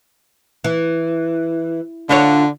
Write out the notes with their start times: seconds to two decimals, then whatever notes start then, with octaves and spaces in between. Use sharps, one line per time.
0.64 E3
2.09 D3 D4 F4 C#5